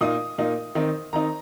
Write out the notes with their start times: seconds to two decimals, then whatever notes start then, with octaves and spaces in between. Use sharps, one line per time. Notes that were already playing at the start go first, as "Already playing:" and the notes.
0.01 A#2 A#3 D#4 D#6
0.38 A#2 A#3 D#4
0.75 D#3 C4 D#4
1.13 D#3 C4 D#4 A#5